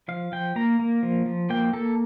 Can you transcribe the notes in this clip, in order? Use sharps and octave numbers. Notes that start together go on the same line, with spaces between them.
F3 F5
F3 G5
A#3 A#5
A#3
F3
F3
A#3 G5
A#3 A4